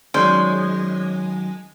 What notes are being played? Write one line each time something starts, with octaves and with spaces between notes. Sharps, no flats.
D#3 F#3 G#3 C#4 C5 D5